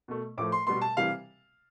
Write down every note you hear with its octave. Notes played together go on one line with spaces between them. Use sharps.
B2 A3
A2 F3 A3 D6
C6
B2 G3 B3 C6
A5
C3 E3 G3 F5